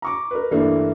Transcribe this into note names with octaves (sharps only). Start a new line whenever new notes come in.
A#5 C#6 D6
A#4 B4
G2 E3 A3 A#3 D4